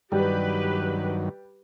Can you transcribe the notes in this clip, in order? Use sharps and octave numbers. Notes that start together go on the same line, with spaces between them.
G2 D#3 F#3 G3 G4 B4